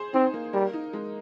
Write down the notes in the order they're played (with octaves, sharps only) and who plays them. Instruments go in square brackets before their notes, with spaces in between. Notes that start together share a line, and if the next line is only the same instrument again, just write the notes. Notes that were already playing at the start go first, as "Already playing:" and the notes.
Already playing: [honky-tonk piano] G#4 C5
[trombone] C4 [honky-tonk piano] D#4
[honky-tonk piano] A#3
[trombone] G3 [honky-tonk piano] A#4
[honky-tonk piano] D#4
G#3